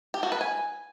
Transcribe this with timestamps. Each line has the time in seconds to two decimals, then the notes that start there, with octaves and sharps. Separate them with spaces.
0.14 G4
0.23 F#4
0.32 B4
0.41 G#5